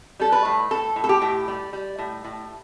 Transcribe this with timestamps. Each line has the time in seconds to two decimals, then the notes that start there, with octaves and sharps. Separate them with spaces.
0.20 G3 A4
0.32 B4
0.45 A2
0.71 A2 A4
0.96 A2
1.04 A4
1.09 G4
1.22 A2
1.48 G3
1.73 G3
1.98 A2
2.24 A2